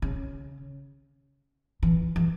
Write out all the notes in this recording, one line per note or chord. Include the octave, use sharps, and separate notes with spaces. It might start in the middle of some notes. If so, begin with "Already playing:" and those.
C#3
E3
E3